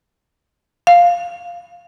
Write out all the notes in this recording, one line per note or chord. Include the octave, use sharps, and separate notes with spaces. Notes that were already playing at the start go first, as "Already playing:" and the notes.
F5